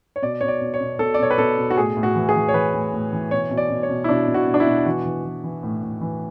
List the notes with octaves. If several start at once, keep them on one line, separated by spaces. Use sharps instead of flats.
C#5
B2 D5
B2 C#5
D5
B2
C#5
B2
B2 A4
D5
B2 C#5
B4
B2 A4
B2
F#4
A2 G#4
A2
F#4
E3
G#4
E3
C#5
E3 B4
A2
A2
E3
B2 C#5
B2
D5
B2
C#5
B2
E4
B2 D4
B2
F#4
B2
D4
E4
B2
E3 F#4
E3
E3
E3
A2
A2
E3